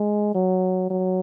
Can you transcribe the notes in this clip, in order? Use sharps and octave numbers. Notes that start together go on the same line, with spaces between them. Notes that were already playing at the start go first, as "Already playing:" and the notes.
Already playing: G#3
F#3
F#3